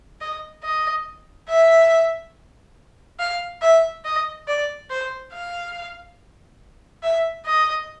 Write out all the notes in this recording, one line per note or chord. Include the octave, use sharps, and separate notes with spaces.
D#5
D#5
E5
F5
E5
D#5
D5
C5
F5
E5
D#5